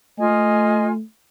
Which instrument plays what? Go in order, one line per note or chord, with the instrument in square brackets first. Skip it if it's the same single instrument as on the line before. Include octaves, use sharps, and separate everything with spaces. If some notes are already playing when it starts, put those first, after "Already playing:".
[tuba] A3 [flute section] F4 G#5 [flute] D#5